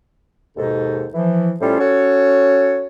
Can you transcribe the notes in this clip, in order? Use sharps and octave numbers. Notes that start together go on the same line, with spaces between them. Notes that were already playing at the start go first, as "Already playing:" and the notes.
D#2 G#2 B2 D#4 A4
E3 F3
A2 G3 C#4 F4 A4 C5
C#4 F#4 A4 C#5